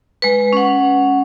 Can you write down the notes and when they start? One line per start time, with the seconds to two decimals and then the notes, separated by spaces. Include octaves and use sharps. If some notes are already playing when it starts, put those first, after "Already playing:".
0.22 G#3 B4
0.53 C#4 F#5